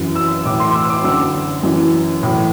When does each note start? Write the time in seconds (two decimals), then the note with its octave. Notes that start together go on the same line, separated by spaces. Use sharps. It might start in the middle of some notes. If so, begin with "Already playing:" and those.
Already playing: F#2 E3
0.16 E6
0.45 A2 E3 D6
0.60 C6
0.75 E6
0.90 D6
1.04 F#2 D3 E6
1.63 F#2 E3
2.23 A2 E3